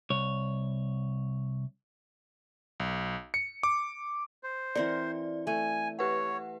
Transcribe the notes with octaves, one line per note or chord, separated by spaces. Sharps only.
C2 C#5
B1
C#7
D6
C5
E3 C4 A#4 D5
A3 G#5
G4 B4 C#5 F#5